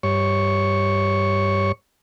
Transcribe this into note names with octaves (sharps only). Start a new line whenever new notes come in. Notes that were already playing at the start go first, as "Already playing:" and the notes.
G2 C#5 C#6